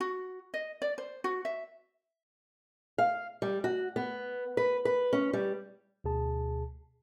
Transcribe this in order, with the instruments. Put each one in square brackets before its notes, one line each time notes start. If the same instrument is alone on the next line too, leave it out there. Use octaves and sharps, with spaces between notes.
[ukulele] F#4
D#5
D5
C5
F#4
E5
[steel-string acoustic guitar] F5
G3
F#4
B3
B4
B4
C#4
G3
[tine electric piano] D2 B2 G#4 A5